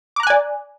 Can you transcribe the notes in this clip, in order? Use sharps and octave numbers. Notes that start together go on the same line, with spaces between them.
D5 G#5 A#5 D6 F#6